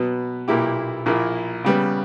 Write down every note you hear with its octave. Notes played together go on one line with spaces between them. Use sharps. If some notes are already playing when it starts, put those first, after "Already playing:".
Already playing: B2 F#3 B3
B1 A#2 A#3 E4 G4
A#1 A#2 A#3 E4
C#3 G3 B3